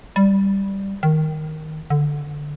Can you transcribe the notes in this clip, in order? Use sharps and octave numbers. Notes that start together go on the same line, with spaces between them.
G3
D#3
D3